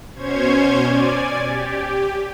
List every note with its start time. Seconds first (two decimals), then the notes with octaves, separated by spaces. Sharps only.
0.14 B2 C#4 C5 C#5 G#6
0.84 D5 G#5
1.46 G4